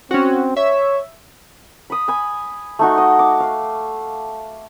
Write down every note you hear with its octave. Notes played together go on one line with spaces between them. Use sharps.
C4 C#4 F#4
C#5 E5
B5 D#6
G#5 B5
A3 D#4 F#4
D#5
D6
F5